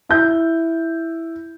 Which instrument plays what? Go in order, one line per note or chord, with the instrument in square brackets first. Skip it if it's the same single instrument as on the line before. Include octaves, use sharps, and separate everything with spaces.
[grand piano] E4 G6